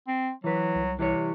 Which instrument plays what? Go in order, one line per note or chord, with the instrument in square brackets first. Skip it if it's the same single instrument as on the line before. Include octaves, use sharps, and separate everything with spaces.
[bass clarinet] C4
[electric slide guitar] E3 B4 [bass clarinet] F#3
[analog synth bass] C2
[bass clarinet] C3 [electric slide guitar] E3 G3 C#5